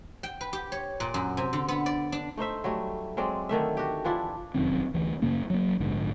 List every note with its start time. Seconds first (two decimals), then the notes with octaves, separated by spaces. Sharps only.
0.23 G5
0.41 B4
0.53 G4
0.72 C#5
1.00 A#2
1.14 F#2
1.37 C3
1.53 D3
1.68 B3
1.86 D5
2.12 D4
2.37 A3 D#4 C5 E5
2.64 F#3 G3 A3
3.17 F#3 G#3 C4 D5
3.49 D3 D#3 A3 E5
3.77 F#4 G4
4.04 E3 F3 D4 E4
4.54 F1 F#2 D#3 C4
4.94 D2 E3
5.22 F#2 C#3 A#3 C#4
5.50 F#3 A#3
5.80 A#1 G#2 D3